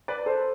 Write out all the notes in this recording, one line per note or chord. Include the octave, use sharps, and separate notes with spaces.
B4 D5
A4 C5